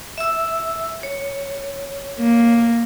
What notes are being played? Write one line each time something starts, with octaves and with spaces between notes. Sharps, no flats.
E5 E6
C#5
A#3